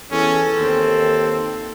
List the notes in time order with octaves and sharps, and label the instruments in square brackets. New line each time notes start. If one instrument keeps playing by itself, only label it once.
[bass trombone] E2 [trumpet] C#4 [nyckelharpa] A4
[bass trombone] D#2 [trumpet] C4